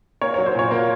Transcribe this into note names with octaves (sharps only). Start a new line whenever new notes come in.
A#3 C#5
F#3 C#5
C5
A#2 C#5
A#3